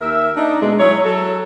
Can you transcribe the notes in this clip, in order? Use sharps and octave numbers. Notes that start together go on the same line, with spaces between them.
D#2 A#4 E5
D4 D#4
B2 G#3
F#3 E4 G#4 C#5
F#3 A4